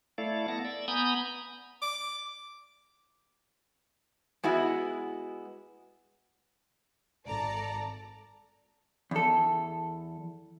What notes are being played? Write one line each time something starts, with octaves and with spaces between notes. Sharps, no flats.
A3 E4 A4 D5 F5
B3 A4 A5 A#6
D5 E6
B3 G#5 A#5 B5 D#6 G6
D6
G#3 B3 E4 F#4
G#1 A4 D5 A5 A#5
E2 A4